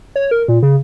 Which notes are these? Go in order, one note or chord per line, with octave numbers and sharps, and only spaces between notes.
C#5
A#4
A#2
C#3